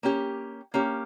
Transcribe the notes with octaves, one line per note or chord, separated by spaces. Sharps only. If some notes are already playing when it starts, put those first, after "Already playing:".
A#3 C#4 G4
A#3 C#4 G4